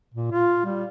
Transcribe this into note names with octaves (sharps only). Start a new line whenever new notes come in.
A#2
F4
G3